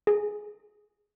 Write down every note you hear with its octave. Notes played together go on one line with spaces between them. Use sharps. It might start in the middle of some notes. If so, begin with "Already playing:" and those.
G#4